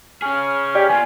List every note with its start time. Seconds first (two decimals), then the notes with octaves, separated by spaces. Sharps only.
0.22 C#4 G#4 C#6 F6
0.75 G4 D5
0.89 B3 F4 G#5